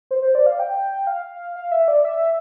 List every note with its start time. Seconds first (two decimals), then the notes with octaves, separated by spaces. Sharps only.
0.11 C5
0.22 C5
0.35 D5
0.46 F5
0.59 G5
1.07 F5
1.56 F5
1.72 E5
1.88 D5
2.05 E5